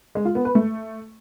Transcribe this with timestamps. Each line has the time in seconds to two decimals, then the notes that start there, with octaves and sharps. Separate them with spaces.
0.15 G#3
0.25 F4
0.35 B3
0.45 B4
0.55 A3